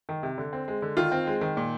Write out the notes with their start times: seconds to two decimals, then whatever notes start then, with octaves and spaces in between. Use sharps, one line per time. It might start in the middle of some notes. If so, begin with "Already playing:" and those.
0.09 D#3
0.23 C3
0.38 D3
0.53 C4
0.68 G#3
0.82 D3
0.97 D#3 F4
1.12 C4
1.27 G#3
1.41 D#3
1.57 A#2